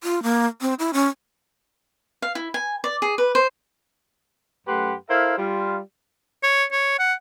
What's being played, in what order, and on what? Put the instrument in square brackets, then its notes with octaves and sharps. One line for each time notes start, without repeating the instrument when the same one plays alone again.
[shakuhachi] F4
A#3
C4
E4
C#4
[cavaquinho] F5
E4
G#5
D5
G#4
B4
C5
[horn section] F#2 A3 G4 B4 F#5 C6
E4 A4 A#4 C5 E5 F5
G3 F4
[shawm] C#5
C#5
F#5